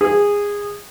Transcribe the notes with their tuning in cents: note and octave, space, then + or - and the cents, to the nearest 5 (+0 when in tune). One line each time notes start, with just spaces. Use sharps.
G#4 -20